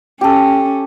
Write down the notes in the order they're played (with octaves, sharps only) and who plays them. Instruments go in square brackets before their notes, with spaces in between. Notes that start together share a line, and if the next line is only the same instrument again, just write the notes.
[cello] C#4 [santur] G4 A4